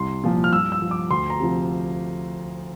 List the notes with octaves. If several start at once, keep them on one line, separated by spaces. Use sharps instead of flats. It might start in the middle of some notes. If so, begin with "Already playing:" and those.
Already playing: C2 C6
A#2 F3
F6
G2 E6
E6
F3
D6
D2 C6
A#5
C3 F3